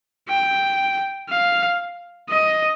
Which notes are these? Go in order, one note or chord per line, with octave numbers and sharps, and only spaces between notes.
G5
F5
D#5